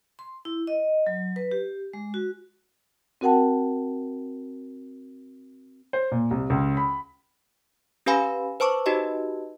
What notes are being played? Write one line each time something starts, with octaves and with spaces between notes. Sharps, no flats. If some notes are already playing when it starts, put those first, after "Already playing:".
C6
E4
D#5
F#3
B4
G4
G#3
F#4
C4 F#4 A#4 F#5 G5 A5
C5
A#2
C2
C#2
B5
C#4 G4 B4 F5 G#5 B5
B4 C5 A5 C#6 D6
D#4 F#4 G4 B4 D#5 A5